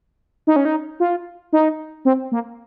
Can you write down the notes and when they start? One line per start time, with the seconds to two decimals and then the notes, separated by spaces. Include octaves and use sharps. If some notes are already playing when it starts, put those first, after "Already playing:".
0.47 D#4
0.56 C#4
0.65 D#4
1.00 F4
1.53 D#4
2.05 C4
2.32 A#3